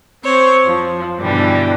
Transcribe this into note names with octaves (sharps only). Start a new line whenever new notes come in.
C4 C5 C#5
F2 F3
G2 B2 D3 E3 G3 G4